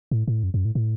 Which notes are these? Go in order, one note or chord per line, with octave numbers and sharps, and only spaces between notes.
A2
A2
F#2
F#2
A2
A2